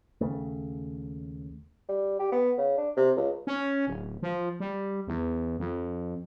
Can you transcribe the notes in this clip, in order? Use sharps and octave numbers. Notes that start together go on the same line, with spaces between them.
D#2 C#3 A3
G3
G4
B3
C#3
D4
C3
C#2
C#4
D1
F3
G3
E2
F2